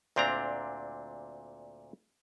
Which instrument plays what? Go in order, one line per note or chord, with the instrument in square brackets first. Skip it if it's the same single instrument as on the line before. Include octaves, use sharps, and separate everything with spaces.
[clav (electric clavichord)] D2 A#2 C4 D4 A#5